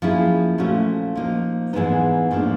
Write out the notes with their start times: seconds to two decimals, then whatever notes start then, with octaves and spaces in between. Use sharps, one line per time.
0.02 F3 A#3 C#4 E4 G#4
0.58 A#2 F3 A3 C#4 F#4
1.16 F3 A#3 D#4
1.73 G#2 E3 G#3 B3 D#4
2.31 A2 F3 A#3 D4